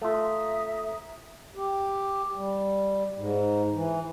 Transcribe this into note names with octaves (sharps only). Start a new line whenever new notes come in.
A3 F4 E5 A#5 D#6
G4
G3
G#2
E3